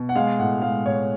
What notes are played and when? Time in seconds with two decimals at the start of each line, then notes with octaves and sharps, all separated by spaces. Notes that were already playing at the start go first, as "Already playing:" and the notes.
Already playing: B2
0.09 F#5
0.15 G#3 F5
0.39 A2 F#5
0.61 G#3 F5
0.85 A2 C#5